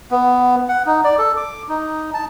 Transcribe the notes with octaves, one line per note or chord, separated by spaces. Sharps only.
B3
F#5
D#4
D5
A4
D6
D#4
A5